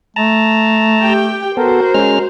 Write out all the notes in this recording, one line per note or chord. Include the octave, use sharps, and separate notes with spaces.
A3 A5 A#5
G4 G5
B3 F#4 A4 A#4 C5
G#3 C#4 F6